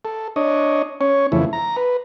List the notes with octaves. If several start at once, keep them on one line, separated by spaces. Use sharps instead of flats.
A4
D4 C#5 D#5
C#4 C#5
F2 C#3 E3 A3 E4
A#5
B4